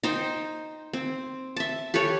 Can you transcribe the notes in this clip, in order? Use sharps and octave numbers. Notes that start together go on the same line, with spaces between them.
D#4 C5 G5
C4
E5 A5
G4 A4 B4 C#5